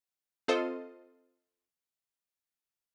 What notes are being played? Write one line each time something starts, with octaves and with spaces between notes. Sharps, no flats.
C4 F4 A4 C5 D#5